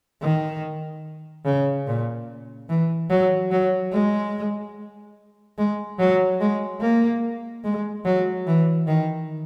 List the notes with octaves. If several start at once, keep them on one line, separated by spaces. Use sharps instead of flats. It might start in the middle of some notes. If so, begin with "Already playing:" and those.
D#3
C#3
A#2
E3
F#3
F#3
G#3
G#3
F#3
G#3
A#3
G#3
F#3
E3
D#3